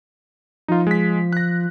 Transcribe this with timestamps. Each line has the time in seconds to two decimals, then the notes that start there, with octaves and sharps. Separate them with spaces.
0.68 F3 D#4 F4
0.87 G#3 B6
1.33 F#6 A#6